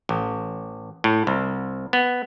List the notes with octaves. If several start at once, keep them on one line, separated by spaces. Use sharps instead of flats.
A1
A2
C2
B3